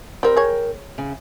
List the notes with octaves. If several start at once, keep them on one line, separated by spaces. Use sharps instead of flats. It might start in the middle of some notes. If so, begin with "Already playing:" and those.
G3 C4 A#4 G5
G#4 C#5
C#3